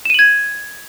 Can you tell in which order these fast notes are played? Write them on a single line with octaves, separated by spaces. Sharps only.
E7 D#7 F#7 G#6